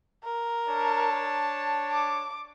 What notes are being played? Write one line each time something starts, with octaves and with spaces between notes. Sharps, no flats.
A#4
D4 C#5 A5
D6